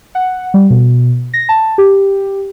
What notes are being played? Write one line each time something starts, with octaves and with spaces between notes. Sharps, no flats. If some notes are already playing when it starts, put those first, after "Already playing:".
F#5
G3
B2
A#6
A5
G4